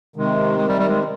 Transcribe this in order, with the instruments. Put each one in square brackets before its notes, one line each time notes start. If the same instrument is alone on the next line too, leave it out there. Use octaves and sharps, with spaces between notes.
[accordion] C3 D#3 [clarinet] G#3
[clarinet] G#3
G3
G3
G#3